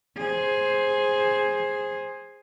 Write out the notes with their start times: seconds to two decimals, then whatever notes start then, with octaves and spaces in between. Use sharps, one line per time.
0.18 G#4 C5